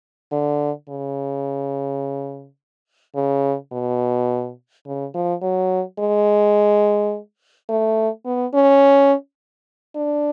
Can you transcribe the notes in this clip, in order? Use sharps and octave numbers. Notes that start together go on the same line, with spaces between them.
D3
C#3
C#3
B2
C#3
F3
F#3
G#3
A3
B3
C#4
D4